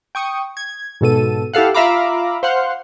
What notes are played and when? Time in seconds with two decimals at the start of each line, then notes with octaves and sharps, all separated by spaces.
0.15 G5 C#6 D#6
0.57 G#6
1.01 G#2 B2 A4 D#7
1.53 E4 G4 A4 F5 F#5
1.74 F4 E5 F5 A#5 B5 D6
2.43 C5 F5 F#5 C6